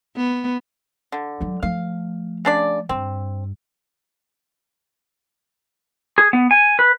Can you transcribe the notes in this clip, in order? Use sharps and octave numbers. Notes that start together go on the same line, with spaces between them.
B3
D3
F#3 G3
F3 A3 F5
C#3 D4 D5
G2 C4
G#4
B3
G#5
B4